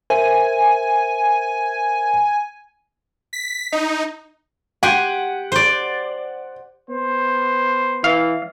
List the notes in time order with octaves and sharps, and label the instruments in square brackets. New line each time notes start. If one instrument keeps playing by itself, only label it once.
[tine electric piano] A#4 C5 E5 [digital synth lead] G#5
[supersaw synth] B6
D#4
[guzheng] G4 G#5 C6 [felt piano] F#5
[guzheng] C5 D5
[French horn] B3 [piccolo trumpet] C5
[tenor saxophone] E3 [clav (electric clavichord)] F5